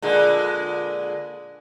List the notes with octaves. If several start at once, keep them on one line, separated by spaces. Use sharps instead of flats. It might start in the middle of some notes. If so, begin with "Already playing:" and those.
A#2 D3 G#3